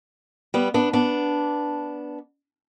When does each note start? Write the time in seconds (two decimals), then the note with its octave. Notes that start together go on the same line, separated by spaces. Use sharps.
0.54 G3 B3
0.74 B3 D4
0.93 B3 D4